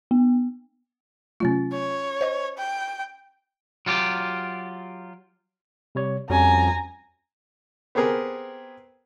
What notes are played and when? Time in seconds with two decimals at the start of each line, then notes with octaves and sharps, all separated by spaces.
0.11 B3
1.40 C3 F#3 A3 C#4 F4
1.72 C#5
2.21 C5 D#5 C#6
2.58 G5
3.86 F#3 F4 G4 D5
5.95 C3 G3 C#5
6.30 F2 G3 C#4 F#4 G#5 A#5
7.95 B3 C4 G4 G#4 A#4